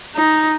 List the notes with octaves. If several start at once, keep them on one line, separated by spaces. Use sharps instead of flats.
D#4